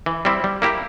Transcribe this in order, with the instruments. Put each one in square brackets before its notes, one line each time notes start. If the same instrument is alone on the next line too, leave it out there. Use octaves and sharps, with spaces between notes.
[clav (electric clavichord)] E3
G3 C4 E4
G3
A#3 E4 G4